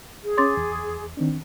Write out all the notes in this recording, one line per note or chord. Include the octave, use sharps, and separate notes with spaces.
G#4
C#4 C#5 C6 D6 A6
E2
D#3 C4 D4